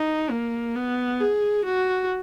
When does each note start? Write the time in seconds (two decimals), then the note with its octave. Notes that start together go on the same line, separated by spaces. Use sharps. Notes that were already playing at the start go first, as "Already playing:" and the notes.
Already playing: D#4
0.31 A#3
0.76 B3
1.20 G#4
1.66 F#4